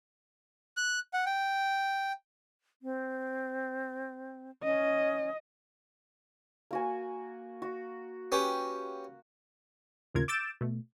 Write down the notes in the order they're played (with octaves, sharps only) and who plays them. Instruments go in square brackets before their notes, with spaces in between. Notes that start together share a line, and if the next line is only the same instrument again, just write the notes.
[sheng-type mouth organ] F#6
F#5
G5
[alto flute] C4
[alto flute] C#4 [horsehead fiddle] D#5
[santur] A#3 F#4 G#5
F#4
[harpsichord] C#4 G4 B4
[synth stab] A1 D#2 C#3 F4 A#4 G#6
D6 E6 G6 A6 D7 E7
B2 A3